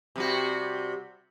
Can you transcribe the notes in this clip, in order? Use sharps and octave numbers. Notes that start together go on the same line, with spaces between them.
C3 G3 F#4